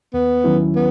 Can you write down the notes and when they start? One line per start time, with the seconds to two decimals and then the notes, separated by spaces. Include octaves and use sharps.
0.14 D#2 B3
0.44 D#3 F#3 C#4 E4
0.76 B3